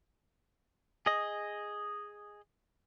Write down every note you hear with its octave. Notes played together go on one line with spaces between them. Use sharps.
G#4 D#5